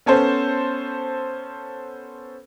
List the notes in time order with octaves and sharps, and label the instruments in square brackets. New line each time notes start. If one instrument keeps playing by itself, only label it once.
[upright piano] B3 C#4 A4 C5